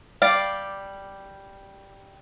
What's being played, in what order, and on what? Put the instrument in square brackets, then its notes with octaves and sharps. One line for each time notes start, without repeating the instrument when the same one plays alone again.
[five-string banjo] G3 D5 F5